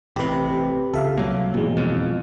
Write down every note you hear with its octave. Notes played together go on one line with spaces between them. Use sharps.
A1 C3 G4 B4
C#2 A4 E5 F5
C2 F#3 A#3
G#1 B2 E3 G#3
F2